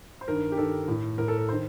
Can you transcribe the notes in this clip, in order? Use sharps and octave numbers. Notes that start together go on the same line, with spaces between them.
C5
G2 D#3 A#4
G4
G2 D#3 A4
A2
A2 A#4
A4
A#4
C5
D#3